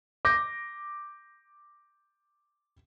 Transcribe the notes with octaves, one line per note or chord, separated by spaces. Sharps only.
D6 G6 A#6